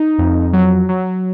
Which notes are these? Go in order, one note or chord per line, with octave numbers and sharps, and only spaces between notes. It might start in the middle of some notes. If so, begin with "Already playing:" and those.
Already playing: D#4
F2
F#3
F#3